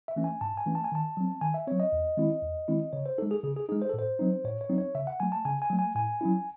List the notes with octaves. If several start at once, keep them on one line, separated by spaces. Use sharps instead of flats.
E5
E3 A3 C#4
G#5
G#2 A5
G#5
E3 A3 C#4
A5
G#5
D#3 A5
F#3 C4
D#3 G#5
E5
F#3 C4 C#5
D#5
E2
D#3 G#3 C4 E4
E2
D#3 G#3 C4 E4
C#3 C#5
C5
G#3 D#4 A4
G#4
C#3 G#4
G#4
G#3 D#4 G#4
C5
A4
A2
C5
F#3 C4 D#4
A2 C#5
C#5
F#3 C4 D#4
C#5
C#3 E5
F#5
F#3 A3 G#5
A5
C#3 G#5
G#5
F#3 A3
G#5
A2 G#5
F#3 C#4 E4